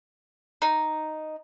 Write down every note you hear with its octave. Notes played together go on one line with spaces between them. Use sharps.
D#4